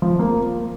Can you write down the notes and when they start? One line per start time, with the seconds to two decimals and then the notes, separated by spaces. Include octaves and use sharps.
0.02 F3
0.19 A#3